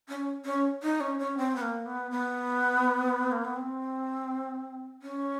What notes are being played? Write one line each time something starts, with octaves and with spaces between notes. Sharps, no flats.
C#4
C#4
D#4
C#4
C#4
C4
B3
A#3
B3
B3
A#3
B3
C4
C#4